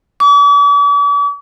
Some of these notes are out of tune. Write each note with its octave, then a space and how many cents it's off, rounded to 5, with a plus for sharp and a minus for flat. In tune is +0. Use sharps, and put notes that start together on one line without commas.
D6 -45